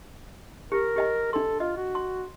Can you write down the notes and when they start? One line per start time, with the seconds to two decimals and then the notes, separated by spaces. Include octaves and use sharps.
0.72 G4 A#4
0.96 G4 D#5 G#5
1.33 D4 A4 C6
1.60 F4 D#5
1.77 F#4
1.95 C6